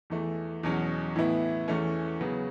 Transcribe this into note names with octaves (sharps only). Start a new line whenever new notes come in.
E2 E3 A3
E2 B2 F#3 C#4
A2 E3 B3 E4
E2 E3 A3 C#4
C#3 F#3 B3